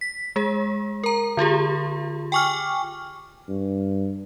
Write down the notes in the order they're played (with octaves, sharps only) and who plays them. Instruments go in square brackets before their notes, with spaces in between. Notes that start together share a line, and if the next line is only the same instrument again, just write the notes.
[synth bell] B6
G#3 G#4
A#4 A#5
D3 F4 G4 G#4
G5 G#5 C#6 D6 F6
[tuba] G2